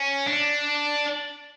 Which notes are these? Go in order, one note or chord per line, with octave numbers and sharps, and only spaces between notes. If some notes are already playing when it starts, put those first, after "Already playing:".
Already playing: C#4
D4